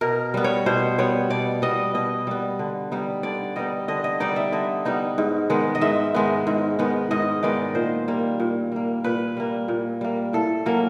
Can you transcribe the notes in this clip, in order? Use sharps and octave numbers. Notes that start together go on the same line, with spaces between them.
B2 A#4
G3 B3
C#5
B2 C5
G3 B3 C#5
B2 D5
G3 B3 D#5
B2 D#5
G3 B3
D3
G3 B3 D#4
D3 D5
G3 B3 D#4 D#5
D3 D#5
D#5
G3 B3 D#4 D5
E5
D3 D#5
G3 B3 D#4
G#2
D#3 G#3 B3
D#5
G#2 E5
D#3 G#3 B3
G#2
D#3 G#3 B3
G#2 D#5
D#3 G#3 B3 D5
A#2 C5
G3 A#3
A#2
G3 A#3
A#2 B4
G3 A#3
A#2
G3 A#3
A2 A4
F#3 A#3 C#4